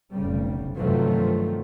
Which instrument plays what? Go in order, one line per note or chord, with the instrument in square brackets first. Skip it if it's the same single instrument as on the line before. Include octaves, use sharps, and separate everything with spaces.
[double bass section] F1 B1 C#3 G3
G2 C3 D#3 F3 F#3 A3